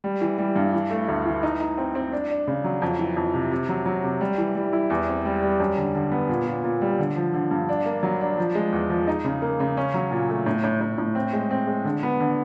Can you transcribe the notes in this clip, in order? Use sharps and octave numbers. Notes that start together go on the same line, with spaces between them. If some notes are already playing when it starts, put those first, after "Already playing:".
G3
E3
G3
G2
E3
A3
D2
E3
D#4
D#4
C4
C4
D4
D4
C#3
F#3
F2
E3
F2
C3
C3
F#3
F#3
C3
G3
E3
G3
E4
E2
C4
G3
G3
F#2
D3
D3
B3
A#2
A#2
A#2
G3
D3
F3
D3
G2
D4
A#3
F#3
D4
F3
G#3
E2
F3
D#4
C#3
A#3
C#3
C#4
F#3
A#2
A3
A2
A2
A2
A2
C4
G#3
C4
G#3
D3
B3
D3